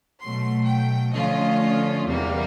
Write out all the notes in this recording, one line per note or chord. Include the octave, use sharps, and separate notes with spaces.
B2 F#3 A3 C6
G5
D3 F3 A3 C#4 F4 D#5
E2 C3 E3 G3 A#3